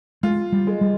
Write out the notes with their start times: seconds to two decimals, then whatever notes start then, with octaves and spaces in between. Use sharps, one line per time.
0.23 G#3 F4
0.52 G3
0.67 G#3
0.81 G3